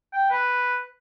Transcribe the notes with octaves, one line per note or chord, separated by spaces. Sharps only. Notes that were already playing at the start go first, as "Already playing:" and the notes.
G5
B4